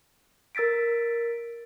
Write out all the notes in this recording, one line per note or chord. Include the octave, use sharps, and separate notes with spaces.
A#4 E6 A6 B6 D7